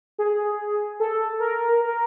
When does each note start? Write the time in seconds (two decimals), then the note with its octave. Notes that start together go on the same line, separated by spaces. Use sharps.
0.19 G#4
1.00 A4
1.40 A#4
1.81 A#4